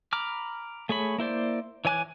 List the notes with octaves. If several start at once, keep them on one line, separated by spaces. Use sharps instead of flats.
A#5 B5 D6 F6
A3 G#4 C#5 B5
A#3 E4 C5 D5
E3 C#5 G#5 D6 F#6